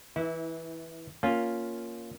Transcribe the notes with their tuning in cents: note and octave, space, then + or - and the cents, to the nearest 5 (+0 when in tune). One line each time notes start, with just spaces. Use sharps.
E3 -10 E4 -30
A#3 +0 C#4 +10 F4 +0